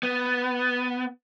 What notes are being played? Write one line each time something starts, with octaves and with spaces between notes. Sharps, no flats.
B3